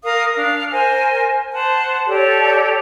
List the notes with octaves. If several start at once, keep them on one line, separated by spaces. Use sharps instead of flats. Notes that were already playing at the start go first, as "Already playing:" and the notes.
A#4 F5 D#6
D4 F5
A#4 C5 G#5
C5 F#5 A5
G4 A4 C#5 D5